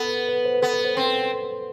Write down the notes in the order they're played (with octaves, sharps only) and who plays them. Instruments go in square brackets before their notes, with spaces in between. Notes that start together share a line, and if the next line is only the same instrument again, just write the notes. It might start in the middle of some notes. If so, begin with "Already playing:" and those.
Already playing: [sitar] B3 [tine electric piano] A4
[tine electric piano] B4
C5
B4
[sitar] B3 [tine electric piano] A4
[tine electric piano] B4
C5
[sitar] C4 [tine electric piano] B4
[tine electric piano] A4